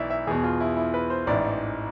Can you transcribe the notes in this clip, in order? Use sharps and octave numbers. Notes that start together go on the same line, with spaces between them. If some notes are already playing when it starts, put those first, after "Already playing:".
Already playing: B1 E3 D5 E5
E5
E2 B2 G#4
F4
E4
E4
B4
C5
A1 G#2 E3 D5